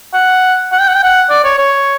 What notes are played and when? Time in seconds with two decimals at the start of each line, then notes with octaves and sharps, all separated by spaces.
0.14 F#5
0.72 F#5
0.79 G5
0.88 F#5
0.96 G5
1.03 F#5
1.29 D5
1.44 C#5
1.58 C#5